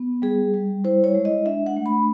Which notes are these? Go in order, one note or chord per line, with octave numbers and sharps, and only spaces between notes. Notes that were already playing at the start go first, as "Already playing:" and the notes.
Already playing: B3
G3 G#4
G3
E4 C5
C#5
G#3
D#5
D4 E5
F#5
A3
B5